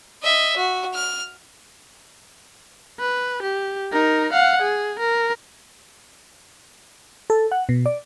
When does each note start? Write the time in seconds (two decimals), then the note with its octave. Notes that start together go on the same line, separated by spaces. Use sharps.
0.23 D#5 E5
0.56 F#4
0.94 F6
3.00 B4
3.43 G4
3.92 D#4 A#4
4.33 F5 F#5
4.62 G#4
4.99 A#4
7.30 A4
7.52 F#5
7.69 B2
7.86 D5